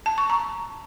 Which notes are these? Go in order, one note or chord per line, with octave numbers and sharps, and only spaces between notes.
A5
C#6
A#5